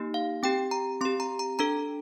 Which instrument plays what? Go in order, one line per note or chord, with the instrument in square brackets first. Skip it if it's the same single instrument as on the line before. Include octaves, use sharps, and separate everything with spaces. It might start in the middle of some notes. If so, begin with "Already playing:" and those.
Already playing: [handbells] A#3 D#4 G4
F5
C4 G4 G5
A#5
C4 C6
G4
A#5
A#5
D4 A4 A#5